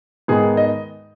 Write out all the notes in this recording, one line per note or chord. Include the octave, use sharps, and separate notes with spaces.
G#2 D#3 G#3 B3 G#4
D#5